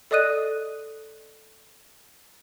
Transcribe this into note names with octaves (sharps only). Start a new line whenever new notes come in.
A4 D5 D#5 D#6 F#6 D#7